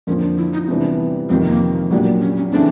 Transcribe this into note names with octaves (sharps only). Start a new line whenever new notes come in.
F2 D3 F3 A#3 C#4
D4
E4
D#4
C3 E3 G3 B3 D4
F2 C3 D#3 C4
A#3
A#2 F#3 A#3 B3 D4 G4
C#4
C#4
C#3 E3 A3 C4 D4